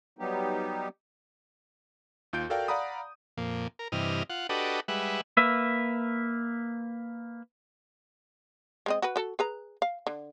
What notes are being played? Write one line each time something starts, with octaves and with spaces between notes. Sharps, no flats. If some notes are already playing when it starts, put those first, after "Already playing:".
F#3 G3 B3 D#4 G4
D#2 F4 G6 D7
F#4 A4 A#4 D5 F5 G5
D5 F5 F#5 A#5 B5 D#6
F2 A#2
A#4
G2 C3 E3 D#5 F6
F4 F#5
D4 F#4 G4 A4 B4 D#5
G3 G#3 B4 E5 F#5
A#3 B4 E5
G#3 C4 D#5
F#4 B4
F#4 A4
G#4 B4 A#5
F5
D3